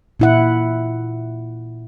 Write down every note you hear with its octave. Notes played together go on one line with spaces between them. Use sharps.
A#2 E4 F#5